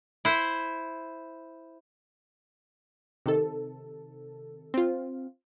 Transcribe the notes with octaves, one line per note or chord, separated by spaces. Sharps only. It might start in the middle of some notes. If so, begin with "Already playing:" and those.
E4 C5
C3 D#3 A4
C4 F4